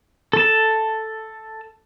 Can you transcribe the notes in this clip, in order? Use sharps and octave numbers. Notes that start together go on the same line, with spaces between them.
A4 A5